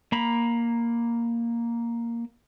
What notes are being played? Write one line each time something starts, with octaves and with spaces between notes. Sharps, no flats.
A#3 A#5 B5